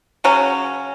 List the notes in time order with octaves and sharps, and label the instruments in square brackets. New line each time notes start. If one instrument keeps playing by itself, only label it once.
[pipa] C#3 F#3 C#4